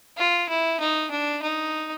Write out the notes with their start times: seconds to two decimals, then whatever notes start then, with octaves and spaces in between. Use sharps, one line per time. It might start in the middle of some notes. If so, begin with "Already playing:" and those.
0.18 F4
0.49 E4
0.80 D#4
1.11 D4
1.42 D#4